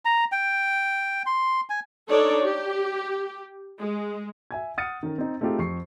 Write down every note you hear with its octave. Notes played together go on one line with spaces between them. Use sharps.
A#5
G5
C6
G#5
D4 D#4 A4 C#5 D5
G4
G#3
E5 G#5 G#6
F#5 D#6 F6 A6 C#7 D#7
D#3 C#4 A#4
C4 D#4
A3 C4 D#4 F4 G4 G#4
F2 C#6 C7